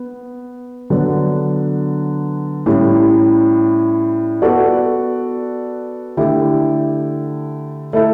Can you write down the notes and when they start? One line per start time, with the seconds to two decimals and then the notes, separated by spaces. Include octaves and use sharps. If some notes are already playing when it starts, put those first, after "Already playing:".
Already playing: B3
0.90 D3 F#3 B3 D4
2.66 A2 G3 C#4
4.42 B3 F#4 A4 D5
6.17 D3 A3 E4 G4
7.93 A3 E4 A4